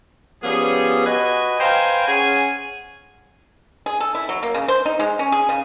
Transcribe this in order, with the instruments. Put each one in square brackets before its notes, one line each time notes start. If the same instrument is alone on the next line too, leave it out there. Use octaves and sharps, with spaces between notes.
[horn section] F3 G3 B3 C#4 G#4
F#4 B4 D#5 G#5
B4 C5 F5 G5 G#5 A#5
C#4 G#4 F#5 G#5
[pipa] G#4
A4
E4
F#3
A#3
C#3
C5
D#4
G#3
C#4
G#4
C#3